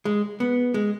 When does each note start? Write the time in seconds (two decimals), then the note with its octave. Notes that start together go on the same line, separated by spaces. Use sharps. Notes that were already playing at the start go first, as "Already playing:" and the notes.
0.05 G#3
0.40 B3
0.74 G#3